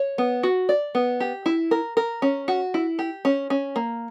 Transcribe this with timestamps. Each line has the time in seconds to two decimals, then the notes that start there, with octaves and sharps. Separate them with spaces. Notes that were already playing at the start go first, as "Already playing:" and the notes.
Already playing: C#5
0.18 B3
0.43 F#4
0.69 D5
0.95 B3
1.20 G4
1.46 E4
1.71 A#4
1.97 A#4
2.22 C#4
2.48 F#4
2.74 E4
2.99 G4
3.25 C#4
3.50 C#4
3.76 A#3